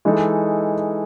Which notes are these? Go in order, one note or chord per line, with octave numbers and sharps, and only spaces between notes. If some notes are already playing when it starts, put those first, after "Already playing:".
E3 G#3 D#4 A4